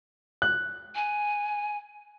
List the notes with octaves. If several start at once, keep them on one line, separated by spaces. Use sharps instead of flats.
F#6
G#5